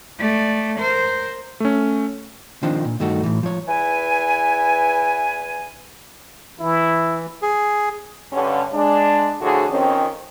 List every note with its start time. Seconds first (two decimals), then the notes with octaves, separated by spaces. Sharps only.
0.18 A3 D5
0.78 A#4 C5
1.60 A3 C#4
2.63 D#3 F3 C4 D4 D#4
2.85 A#2
3.00 G2 D#3 A3 D#4 F#4
3.24 A2 E3
3.43 F3 C#5
3.68 E2 E4 B4 G#5
6.59 E3 E4
7.42 G#4
8.32 G2 D3 C#4
8.73 G#3 D4
9.41 A2 D3 F3 D4 F#4 G#4
9.70 F2 D#3 C4 C#4